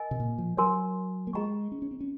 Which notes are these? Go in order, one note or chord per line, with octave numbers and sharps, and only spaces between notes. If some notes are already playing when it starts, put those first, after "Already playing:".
Already playing: A#4 D#5 G#5
C3
A#2
F3
F#3 A#4 C#5 G#5 C6
A#3
G#3 G#4 D#5 A#5 C#6
C#4
C#4
C4
C#4